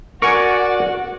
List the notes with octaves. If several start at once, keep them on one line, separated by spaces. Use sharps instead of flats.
F#4 A#4 D5 F#5 G#5 C#6